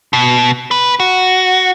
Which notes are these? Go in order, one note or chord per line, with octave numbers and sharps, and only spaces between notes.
B2
B4
F#4